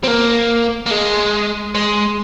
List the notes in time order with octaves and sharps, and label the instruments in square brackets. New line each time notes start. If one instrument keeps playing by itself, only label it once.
[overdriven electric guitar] C4
A#3
A#3
G#3
G#3